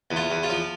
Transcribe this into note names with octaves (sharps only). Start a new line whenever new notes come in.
E2
F4
E2
F4
F3